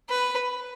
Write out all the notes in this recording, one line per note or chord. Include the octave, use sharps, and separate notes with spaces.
B4